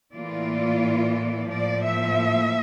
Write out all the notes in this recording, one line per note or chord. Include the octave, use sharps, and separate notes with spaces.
A2 E3 A#3 F4 D5
A2 F3 A#3 D5
E5